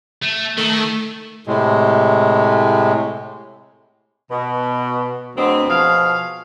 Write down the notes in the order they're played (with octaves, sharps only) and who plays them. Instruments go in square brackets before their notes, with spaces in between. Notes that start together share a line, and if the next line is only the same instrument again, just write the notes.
[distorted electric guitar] A3
[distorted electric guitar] D#3 [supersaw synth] A3
[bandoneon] A2 C3 G#3
[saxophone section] B2
D2 F#3 G#3 B3 C4
B2 F3 G#4 F5